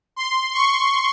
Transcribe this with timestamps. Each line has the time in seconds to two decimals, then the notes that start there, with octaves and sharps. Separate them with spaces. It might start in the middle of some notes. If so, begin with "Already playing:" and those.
0.16 C6
0.53 C#6